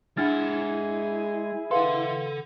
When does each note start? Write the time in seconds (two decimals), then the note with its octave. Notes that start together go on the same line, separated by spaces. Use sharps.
0.17 G#3 D4 E4 G#4 F#5 F6 A6
1.71 A4 B4 F5 F#5 C6